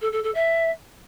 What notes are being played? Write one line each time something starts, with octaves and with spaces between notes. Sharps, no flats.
A4
A4
A4
E5